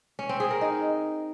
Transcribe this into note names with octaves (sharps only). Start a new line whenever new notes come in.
C#4
C4
G#4
A#4
D#4